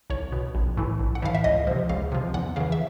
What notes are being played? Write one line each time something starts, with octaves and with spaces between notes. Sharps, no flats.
C2 C#5
B2
A#1
A2 E3
A#1
F#5
A2 E3 F5
E5
C#2 D#5
C3 F3
C#2 F5
C3 F3
E2 F#5
C#3 E3 F5
E5